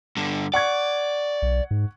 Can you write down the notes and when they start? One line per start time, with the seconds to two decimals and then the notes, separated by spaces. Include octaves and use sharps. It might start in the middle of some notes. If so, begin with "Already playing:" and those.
0.17 G2 D3
0.54 D5 F#5 C#6 G#6
1.42 B1
1.71 G#2